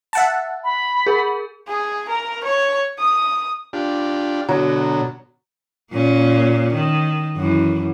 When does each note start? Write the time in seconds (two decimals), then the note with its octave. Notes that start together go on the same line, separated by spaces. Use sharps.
0.13 E5 F#5 A5
0.64 B5
1.06 G#4 A#4
1.68 G#4
2.09 A#4
2.44 C#5
2.99 D#6
3.73 D4 F4 G4
4.49 B2 D3 F#3
5.92 A#2 A#3 C#4
6.75 D#3
7.36 F#2 E3